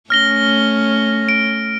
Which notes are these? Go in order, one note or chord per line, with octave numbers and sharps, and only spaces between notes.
A3 C#4 F6 A#6 G7
D7